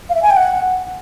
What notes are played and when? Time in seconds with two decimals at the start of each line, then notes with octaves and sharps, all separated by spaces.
0.10 F5
0.15 E5
0.23 G#5
0.30 G5
0.36 F#5